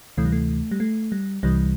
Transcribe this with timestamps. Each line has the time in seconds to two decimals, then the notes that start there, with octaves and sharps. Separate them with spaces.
0.17 D2 C3 E3 A3
0.25 G3
0.32 A3
0.71 G3
0.80 A3
1.12 G3
1.43 C2 C3 E3 G3